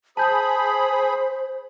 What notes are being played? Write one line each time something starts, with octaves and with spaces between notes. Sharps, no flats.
G#4 C5 A5 B5 G6